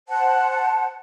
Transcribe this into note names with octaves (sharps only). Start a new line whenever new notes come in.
C5 F#5 A5